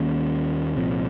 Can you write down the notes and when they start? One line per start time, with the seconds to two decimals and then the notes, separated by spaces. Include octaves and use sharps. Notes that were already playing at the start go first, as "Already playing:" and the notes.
Already playing: D#2 D#3 A#3 C#4
0.76 C2 A#2 F3 C4